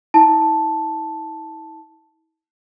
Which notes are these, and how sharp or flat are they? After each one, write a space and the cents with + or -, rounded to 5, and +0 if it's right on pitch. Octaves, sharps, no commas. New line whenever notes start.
E4 -40 A5 +0